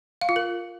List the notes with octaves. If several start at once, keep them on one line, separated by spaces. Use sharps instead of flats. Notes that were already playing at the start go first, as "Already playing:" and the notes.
F5
F4
A#4